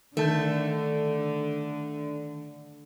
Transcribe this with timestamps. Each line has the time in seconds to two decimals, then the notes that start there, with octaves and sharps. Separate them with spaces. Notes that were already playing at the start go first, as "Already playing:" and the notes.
0.17 D3 D#3 A3 A5 G6